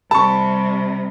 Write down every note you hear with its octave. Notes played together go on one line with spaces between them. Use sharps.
C3 G3 A5 B5 C#6